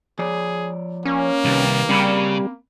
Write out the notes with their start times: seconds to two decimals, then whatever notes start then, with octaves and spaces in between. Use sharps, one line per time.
0.19 F3 G#4 C#5 D5
1.05 A#3 C#4
1.45 C2 D#3 G4 B4
1.89 C#3 G3 C4 B5